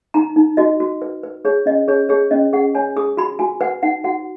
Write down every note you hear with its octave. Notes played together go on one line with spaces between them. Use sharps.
D#4 A#5
D#4
F#4 D#5
F#4
B4
B4
G#4 C#5
C#4 D#5
G#4 C#5
G#4 C#5
C#4 D#5
G#4 F#5
C#5 G#5
G#4 D#6
F#4 B5
F#4 G#5
B4 F#5
D#4 F#5
F#4 F#5